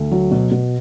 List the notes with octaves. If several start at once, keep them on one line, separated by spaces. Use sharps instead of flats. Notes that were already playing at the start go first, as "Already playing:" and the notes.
Already playing: D2
F#3
B2
B2